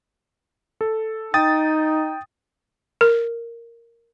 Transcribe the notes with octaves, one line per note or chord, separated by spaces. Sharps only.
A4
D#4 G5 D#6 A6
A#4